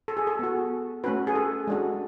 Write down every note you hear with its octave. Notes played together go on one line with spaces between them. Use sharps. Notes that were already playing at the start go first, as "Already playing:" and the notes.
A4
G#4
A4
B3 F#4
A3 C#4 F#4 B4
G#4
A4
G#3 D4 F#4